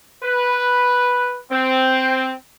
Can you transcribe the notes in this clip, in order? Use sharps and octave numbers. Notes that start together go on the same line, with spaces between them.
B4
C4